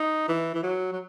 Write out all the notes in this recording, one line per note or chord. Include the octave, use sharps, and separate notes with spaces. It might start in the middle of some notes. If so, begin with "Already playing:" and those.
Already playing: D#4
E3
E3
F#3
F#3